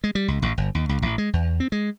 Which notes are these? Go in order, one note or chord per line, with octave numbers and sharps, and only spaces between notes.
G#3
G3
C#2
A1
G1
D#2
C#2
A1
G#3
E2
C4
G#3